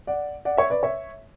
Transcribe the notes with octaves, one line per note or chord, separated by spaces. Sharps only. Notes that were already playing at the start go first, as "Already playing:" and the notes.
D5 F#5
D5 F#5
C#5 E5
B4 D5
C#5 E5